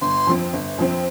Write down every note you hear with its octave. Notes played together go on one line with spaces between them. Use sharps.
G1 C6
F2 F3 C4
G1
F2 F3 C4